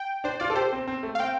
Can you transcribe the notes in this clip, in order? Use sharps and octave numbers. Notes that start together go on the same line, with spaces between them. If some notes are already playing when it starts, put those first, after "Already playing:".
Already playing: G5
D4 C5
F4 D5
A4
G4 C5
C4
C4
A3
F5
C4 G5